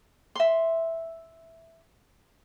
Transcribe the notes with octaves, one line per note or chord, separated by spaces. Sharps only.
E5 C6